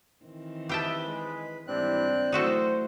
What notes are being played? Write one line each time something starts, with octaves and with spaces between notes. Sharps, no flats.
D#3 E3 C4
G4 B4 C#5 D#5 E5 G5 A5
G#3
G#2 E3 G3 C4 D4 E4 F#6
F#3 A3 D#4 E4 F#4 A4 C5